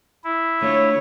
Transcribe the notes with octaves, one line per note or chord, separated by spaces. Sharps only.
E4
D3 A3 F4 C#5